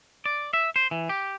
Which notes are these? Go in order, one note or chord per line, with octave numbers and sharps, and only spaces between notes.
D5
E5
C5
E3
G4